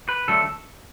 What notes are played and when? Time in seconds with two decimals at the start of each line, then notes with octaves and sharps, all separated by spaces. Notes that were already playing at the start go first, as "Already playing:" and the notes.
0.09 B4
0.28 D3 F#3 A3 A4